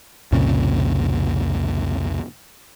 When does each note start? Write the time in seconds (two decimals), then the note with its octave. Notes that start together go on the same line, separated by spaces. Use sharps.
0.32 C2 F2 A#2 C#3